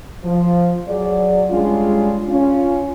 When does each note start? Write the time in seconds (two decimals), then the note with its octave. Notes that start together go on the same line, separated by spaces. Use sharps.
0.24 F3
0.88 F#3 G#4 D5
1.50 G3 G#3 C#4 D4 F4
2.29 C#4 F4